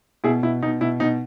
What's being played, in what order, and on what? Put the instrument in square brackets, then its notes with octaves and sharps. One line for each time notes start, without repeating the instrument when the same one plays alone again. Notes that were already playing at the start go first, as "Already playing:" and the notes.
[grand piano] B2 E4 G#4
B2 E4
B2 D#4
B2 E4
B2 D#4